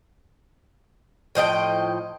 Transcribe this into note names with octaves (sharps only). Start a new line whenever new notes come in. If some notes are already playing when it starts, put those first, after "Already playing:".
A2 F3 D#5 G5